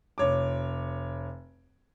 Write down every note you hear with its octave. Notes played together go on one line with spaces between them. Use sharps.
F1 C#5 D6